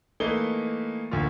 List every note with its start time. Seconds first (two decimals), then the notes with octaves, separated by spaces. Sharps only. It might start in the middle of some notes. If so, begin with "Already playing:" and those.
0.20 E3 A3 A#3 D#4 G7
1.11 D2 A#3 F4